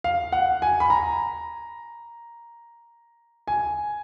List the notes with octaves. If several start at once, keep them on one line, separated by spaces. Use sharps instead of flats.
F5
F#5
G#5
B5
A#5
G#5